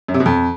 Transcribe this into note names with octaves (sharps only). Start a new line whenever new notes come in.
F#2
C3
B2
F2